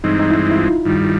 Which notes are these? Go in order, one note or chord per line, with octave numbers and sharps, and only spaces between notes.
G2 E3 G#3 C4 D#4
D#4
E4
E4
F4
G2 D#3 G3